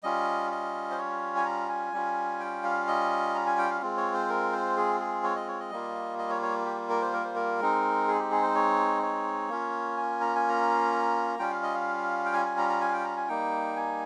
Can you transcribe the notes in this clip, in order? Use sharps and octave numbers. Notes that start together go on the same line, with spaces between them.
G3 C#4 F4 D#5
D#5
C5
C#5
G#5
A#5
G#5
G3 C#4 F4
G5
F5
D#5
A#5
G#5
G5
F5
G#3 C4 F4
C#5
C5
A#4
C5
G#4
G#4
C#5
D#5
C#5
D#5
G3 A#3 F4
D#5
C#5
C#5
G4
A#4
C5
A#4
C5
A#4
G#3 C4 D#4
G#4
G4
G#4
C5
C#5
C#5
A#3 C#4 F4
G#5
A#5
G#5
A#5
G3 C#4 F4 G5
F5
D#5
F5
G5
G#5
G#5
A#5
A#5
G#5
F5
G5
A#5
G#5
G3 A#3 D#4 G5
G#5